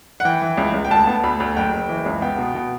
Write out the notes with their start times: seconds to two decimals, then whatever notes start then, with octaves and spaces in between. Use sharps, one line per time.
0.20 F#5
0.25 E3 G5
0.42 E3
0.58 C#2
0.74 C#2
0.85 G5
0.91 D2 A5
1.07 B3
1.24 D2 B5
1.40 D2
1.56 F#1 G5
1.73 F#1
1.89 E3
2.06 C#2
2.22 B3 G5
2.38 B2
2.55 B2